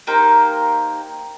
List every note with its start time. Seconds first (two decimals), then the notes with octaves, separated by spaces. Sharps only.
0.07 A#3 D#4 G4 C5